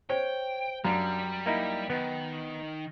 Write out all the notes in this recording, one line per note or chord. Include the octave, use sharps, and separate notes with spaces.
C5 C#5 G5
F#2 G3 D4 F5 A#5
A#3 D#4 E4
D#3 B3